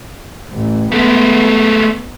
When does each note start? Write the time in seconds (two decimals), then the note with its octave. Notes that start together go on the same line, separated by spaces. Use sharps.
0.52 A1
0.92 G#3 A3 B3